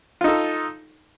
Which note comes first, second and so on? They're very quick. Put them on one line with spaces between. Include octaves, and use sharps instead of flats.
F4 D#4 A4